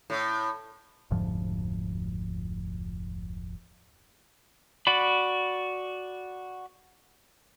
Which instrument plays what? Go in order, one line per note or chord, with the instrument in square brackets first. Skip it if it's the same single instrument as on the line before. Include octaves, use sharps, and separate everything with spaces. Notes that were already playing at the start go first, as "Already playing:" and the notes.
[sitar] A2
[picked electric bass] F1 D2 G#2 F3
[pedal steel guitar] F#4 D5 B5